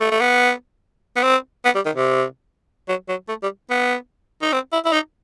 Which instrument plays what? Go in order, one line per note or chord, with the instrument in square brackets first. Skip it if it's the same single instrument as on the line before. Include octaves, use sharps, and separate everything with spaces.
[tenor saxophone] A3
A3
B3
B3
C4
B3
G3
D#3
C3
F#3
F#3
A3
G3
B3
D#4
C4
E4
E4
D#4